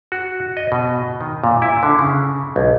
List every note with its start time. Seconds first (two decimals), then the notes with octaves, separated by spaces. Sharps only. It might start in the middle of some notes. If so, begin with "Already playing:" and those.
0.12 F#4
0.57 D#5
0.72 B2
1.21 D#3
1.44 A#2
1.62 E4
1.83 D3
1.99 C#3
2.56 B1